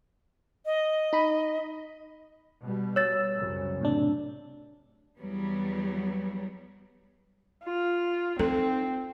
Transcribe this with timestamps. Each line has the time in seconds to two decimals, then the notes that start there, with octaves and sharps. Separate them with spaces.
0.65 D#5
1.13 D#4 B5
2.60 B2 G3
2.96 C#5 E6 A6
3.38 C2 F#2 C#3
3.81 A2 C3 D4
5.20 E2 F#3 G3 B3
7.64 F4
8.39 C4 D#4 A4